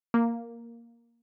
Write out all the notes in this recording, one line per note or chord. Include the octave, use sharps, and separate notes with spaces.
A#3